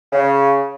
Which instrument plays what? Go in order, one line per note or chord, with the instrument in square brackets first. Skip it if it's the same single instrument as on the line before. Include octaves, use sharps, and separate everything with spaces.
[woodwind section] C#3